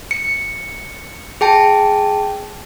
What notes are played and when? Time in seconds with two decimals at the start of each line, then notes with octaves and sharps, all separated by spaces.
0.11 C#7
1.41 G#4 G5 A5